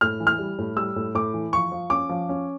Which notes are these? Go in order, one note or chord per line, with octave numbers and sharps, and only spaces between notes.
A2 F6
E3
F6
G3
A2
G3 E6
A2
A2 D6
E3
F3 C#6
F3
C#4 D6
F3
C#4